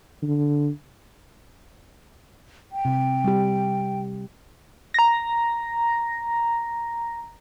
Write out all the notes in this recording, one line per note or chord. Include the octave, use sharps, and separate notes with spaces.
D3
G5
C3
G3 G4
A#5 A#6